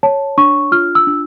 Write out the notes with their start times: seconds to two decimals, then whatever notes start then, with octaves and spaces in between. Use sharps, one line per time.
0.03 C#5 A5
0.38 D4 C#6
0.72 F4 F6
0.95 E6
1.07 D4